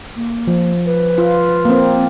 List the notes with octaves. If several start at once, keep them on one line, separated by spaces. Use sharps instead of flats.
A#3
F3
B4
F4
A#3 C4
C4